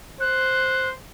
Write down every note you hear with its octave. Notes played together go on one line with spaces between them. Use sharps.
C5 F#6